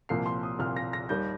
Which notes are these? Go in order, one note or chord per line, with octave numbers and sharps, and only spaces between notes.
C2 A#2 F3 A#3 C7
C6
D#6
C2 A#2 F3 A#3 F6
A#6
A#6
D#2 D#3 G3 G6